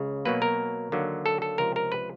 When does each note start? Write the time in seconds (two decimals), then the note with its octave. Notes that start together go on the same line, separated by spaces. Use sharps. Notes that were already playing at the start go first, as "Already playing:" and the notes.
Already playing: C#2 C#3
0.25 B2 F#3 A#3 B4
0.42 A#4
0.92 D#2 D3 F#3 A#3
1.26 A4
1.42 A4
1.58 C#2 C3 F3 A#4
1.76 A#4
1.92 B4